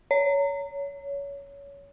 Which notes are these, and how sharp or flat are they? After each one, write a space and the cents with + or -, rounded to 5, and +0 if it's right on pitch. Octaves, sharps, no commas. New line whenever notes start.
C#5 +20